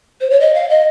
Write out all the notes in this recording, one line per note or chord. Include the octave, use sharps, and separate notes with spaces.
C5
C#5
D#5
F5
D#5